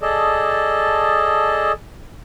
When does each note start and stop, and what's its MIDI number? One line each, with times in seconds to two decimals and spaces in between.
0.02 1.72 68
0.02 1.72 69
0.02 1.72 74
0.02 1.72 75
0.02 1.72 81